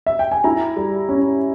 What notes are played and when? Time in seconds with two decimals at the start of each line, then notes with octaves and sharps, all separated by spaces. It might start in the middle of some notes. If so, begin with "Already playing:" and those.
0.06 E5
0.19 G5
0.31 G#5
0.44 E4 A#5
0.76 G3
1.09 C#4